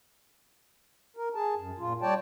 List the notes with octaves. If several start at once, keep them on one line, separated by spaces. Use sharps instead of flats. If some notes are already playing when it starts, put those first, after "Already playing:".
A#4
G#4 A5
F#2
A#2 F4
G3 C#5 D5 G5 A5